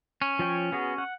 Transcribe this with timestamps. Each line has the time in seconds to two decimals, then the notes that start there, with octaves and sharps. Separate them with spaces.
0.22 C#4
0.39 F3 C#5 G5
0.72 B3 F#4 G#4
0.98 F#5